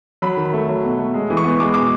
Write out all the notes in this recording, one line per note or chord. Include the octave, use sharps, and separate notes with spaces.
F#3 B5
D#3
B5
A3
F#3
B2
A3
G#3
E3
C#6
B3
G#3 D6
B2 D6